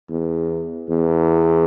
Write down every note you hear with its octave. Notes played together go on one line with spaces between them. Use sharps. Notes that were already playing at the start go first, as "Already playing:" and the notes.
E2
E2